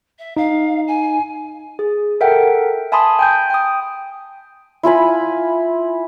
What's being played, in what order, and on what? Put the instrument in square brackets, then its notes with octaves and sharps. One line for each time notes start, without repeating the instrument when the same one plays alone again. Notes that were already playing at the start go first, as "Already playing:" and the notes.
[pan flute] E5
[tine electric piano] D#4 [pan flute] F5
[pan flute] G#5
[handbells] G#4
A4 A#4 E5 F#5 G5
E5 G#5 A5 B5 C6 D#6
G5 G#5 G6
G5 D#6
[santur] E4 F4 G#5 B5